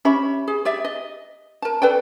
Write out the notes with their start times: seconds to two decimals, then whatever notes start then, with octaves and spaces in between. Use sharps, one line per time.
0.05 C#4 G4 E5 B5
0.48 G#4
0.65 G4 D5 E5
0.84 D#5
1.62 A#4 A5
1.82 A4 B4 D5 G5